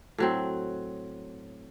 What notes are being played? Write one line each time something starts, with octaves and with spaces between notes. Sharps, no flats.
A2 F#3 C4